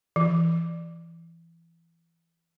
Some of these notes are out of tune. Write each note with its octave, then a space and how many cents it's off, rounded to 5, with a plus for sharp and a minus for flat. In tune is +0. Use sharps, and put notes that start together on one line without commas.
E3 +20